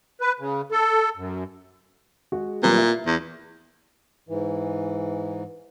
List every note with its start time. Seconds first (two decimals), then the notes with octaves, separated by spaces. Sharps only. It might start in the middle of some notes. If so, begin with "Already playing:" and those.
0.21 B4
0.40 C#3
0.71 A4
1.17 F#2
2.32 G#3 F#4 G#4
2.63 A#2 F#3 G3 B3
2.77 E4
3.06 E2
4.29 G#2 E3